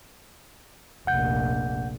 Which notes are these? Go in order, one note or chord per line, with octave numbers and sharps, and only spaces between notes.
F1 A#1 F#5 G6